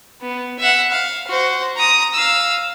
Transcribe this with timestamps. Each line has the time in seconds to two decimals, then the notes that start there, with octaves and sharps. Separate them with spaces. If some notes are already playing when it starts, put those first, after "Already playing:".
0.21 B3
0.59 E5 F#5
0.91 F5
1.28 F#4 C5
1.77 A#5 D#6
2.14 F5 E6